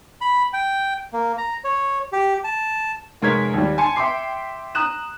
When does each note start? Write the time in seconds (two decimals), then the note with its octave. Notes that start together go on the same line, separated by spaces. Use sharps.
0.21 B5
0.53 G5
1.13 A#3
1.38 A#5
1.64 C#5
2.12 G4
2.44 A5
3.22 F1 G#3 A#4 C#5 G#6 B6
3.54 D#2 G3
3.78 G#5 A5 C6 C#7
3.96 E5 G5 C6 D6 C7
4.75 A#5 D#6 F#6 E7